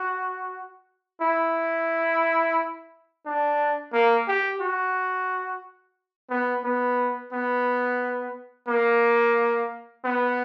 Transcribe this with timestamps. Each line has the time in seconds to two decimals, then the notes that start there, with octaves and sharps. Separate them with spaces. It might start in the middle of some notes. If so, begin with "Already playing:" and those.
Already playing: F#4
1.22 E4
3.26 D4
3.93 A#3
4.28 G4
4.61 F#4
6.30 B3
6.64 B3
7.33 B3
8.68 A#3
10.04 B3